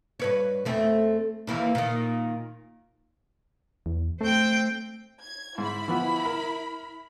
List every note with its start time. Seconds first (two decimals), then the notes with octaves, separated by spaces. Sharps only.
0.19 G2 B4 C#5
0.65 E2 A3 C4
1.47 D#2 E3 A#3
1.75 A#2 D#3
3.86 E2
4.21 A3 C4 G5
5.22 G#6
5.58 G#2 E4 B5
5.88 E3 F3 B3
6.25 A#4